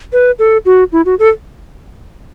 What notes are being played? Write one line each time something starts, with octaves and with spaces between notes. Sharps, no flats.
B4
A4
F#4
E4
F#4
A4